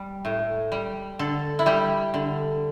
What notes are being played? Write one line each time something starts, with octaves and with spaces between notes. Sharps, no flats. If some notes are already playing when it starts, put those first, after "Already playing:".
Already playing: G3
A2
G3
D3 A4
E4
G3 G4
D3